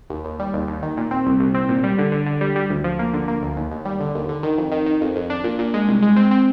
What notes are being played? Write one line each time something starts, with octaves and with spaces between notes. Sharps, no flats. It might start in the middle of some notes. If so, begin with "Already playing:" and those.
D#2
D#2
G3
D#2
D#2
D#3
A#2
C4
C2
C2
C4
A#2
G3
D3
D3
D3
G3
G3
D2
F3
A#3
D3
A#3
D2
D#2
D#2
G3
D3
D#2
D3
D#3
F2
D#3
D#3
F2
F2
D4
A#2
A#2
G#3
C2
G#3
C4
C4